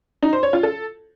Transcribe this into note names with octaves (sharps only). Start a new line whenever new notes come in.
D#4
C5
C#5
F4
A4